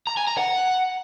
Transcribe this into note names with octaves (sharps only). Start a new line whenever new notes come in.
A#5
G#5
A#5
F#5